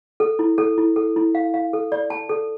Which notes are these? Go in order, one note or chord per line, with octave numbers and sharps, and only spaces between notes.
A4
E4
A4
E4
A4
E4
F5
F5
A4
D5
A5
A4